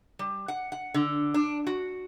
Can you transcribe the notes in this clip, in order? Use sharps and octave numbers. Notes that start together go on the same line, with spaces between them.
G3
F#5
F#5
D3
D4
F#4